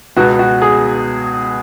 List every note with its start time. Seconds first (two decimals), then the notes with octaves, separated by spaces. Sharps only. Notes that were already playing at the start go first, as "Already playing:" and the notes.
0.16 C#2 B2 B3 F#4
0.39 F#4
0.62 G#4